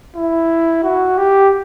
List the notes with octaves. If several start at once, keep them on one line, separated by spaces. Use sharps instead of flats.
E4
F#4
G4